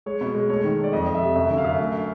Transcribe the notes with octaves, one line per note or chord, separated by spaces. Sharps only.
G#3 C#5
B2
G#3
A3 C#5
D#3
A3
D5
F2 D#5
F2
E5
C3
F#2 E5
D3
F5
F#2
A3